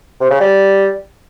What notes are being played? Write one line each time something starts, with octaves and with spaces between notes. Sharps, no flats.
C3
C#3
G3